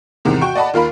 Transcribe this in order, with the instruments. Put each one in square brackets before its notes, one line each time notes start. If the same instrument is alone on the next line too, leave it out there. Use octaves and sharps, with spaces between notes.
[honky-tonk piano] E2 G#2 C3 D#3
F#4 G5 C#6
D5 D#5 F#5 A5 B5
D#2 F4 A#4 B5